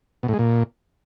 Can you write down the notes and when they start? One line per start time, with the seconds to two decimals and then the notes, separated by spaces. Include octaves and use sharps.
0.23 B2
0.28 A2
0.34 G#3
0.39 A#2